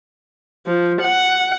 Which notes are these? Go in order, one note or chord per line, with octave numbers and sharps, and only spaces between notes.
F3
F#5